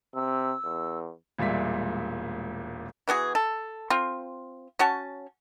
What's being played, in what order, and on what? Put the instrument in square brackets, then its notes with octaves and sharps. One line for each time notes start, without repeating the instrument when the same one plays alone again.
[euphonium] C3 [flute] E6
[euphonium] E2
[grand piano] E1 A#2 G3 G#3 E5 B6
[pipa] E3 B3 F#4 G#4
A4
C4 F4
C#4 F#4 C#5 A5